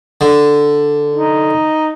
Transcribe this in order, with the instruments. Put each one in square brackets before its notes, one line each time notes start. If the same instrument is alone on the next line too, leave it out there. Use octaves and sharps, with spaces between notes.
[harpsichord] D3
[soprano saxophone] D#4